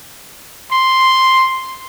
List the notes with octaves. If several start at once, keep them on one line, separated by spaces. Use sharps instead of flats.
C6